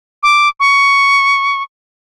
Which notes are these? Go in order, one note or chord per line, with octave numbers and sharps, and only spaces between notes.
D6
C#6